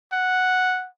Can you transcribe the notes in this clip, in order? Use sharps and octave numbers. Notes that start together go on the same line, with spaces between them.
F#5